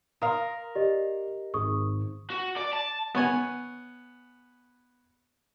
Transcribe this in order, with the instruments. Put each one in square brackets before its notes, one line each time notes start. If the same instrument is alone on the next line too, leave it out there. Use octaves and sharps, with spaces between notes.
[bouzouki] A#4 F5 [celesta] A#5 C6 [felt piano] D#6
[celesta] G4 D#5 [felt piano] D5
[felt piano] G#1 [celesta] G#4 C#6 D#6
[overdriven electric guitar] F#4
D5
A5
[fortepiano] B3 C#5 G#5